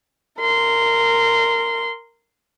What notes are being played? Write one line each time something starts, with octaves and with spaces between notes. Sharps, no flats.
A#4 C6